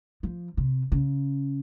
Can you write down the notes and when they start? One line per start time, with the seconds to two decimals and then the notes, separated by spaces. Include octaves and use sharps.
0.23 F3
0.57 C3
0.92 C#3